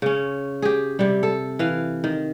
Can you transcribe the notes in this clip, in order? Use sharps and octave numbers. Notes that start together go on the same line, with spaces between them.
C#3 C#4
G4 G#4
C3 G3
A4
E3 F5
D#3